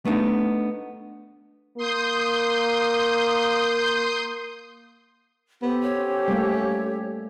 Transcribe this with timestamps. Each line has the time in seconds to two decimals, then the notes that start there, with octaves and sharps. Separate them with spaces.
0.05 A3 B3 C4 D4 D#4
1.77 A#3 C6 D#6 G6
5.62 B3 G4 A4 C5
5.83 C#5
5.98 C#4
6.28 G3 A3 A#3